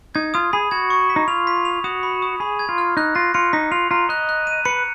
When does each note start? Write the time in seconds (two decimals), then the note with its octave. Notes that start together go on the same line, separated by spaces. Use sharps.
0.15 D#4 G#6
0.34 F4 D#6
0.53 G#4 B5
0.71 F#4 G#6
0.90 C#6
1.10 B6
1.16 D#4
1.28 F4 F7
1.47 B6
1.65 F7
1.84 F#4 D#6
2.03 B5
2.22 D#6
2.40 G#4 B5
2.59 G#6
2.69 F4
2.78 F6
2.97 D#4 F#6
3.15 F4 A#6
3.34 F4 C#7
3.53 D#4 B6
3.71 F4 F7
3.91 F4 A#5
4.09 D#5 F#6
4.29 F#6
4.47 D#7
4.65 B4 C#7